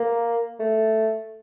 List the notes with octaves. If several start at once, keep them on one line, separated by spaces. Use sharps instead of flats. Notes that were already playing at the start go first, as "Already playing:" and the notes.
Already playing: A#3
A3